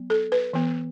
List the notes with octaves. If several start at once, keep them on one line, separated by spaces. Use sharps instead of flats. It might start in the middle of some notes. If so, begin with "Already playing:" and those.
Already playing: F#3 B3
A4
B4
E3 B3